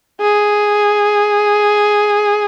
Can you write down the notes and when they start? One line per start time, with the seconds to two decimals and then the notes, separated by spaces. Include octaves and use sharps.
0.21 G#4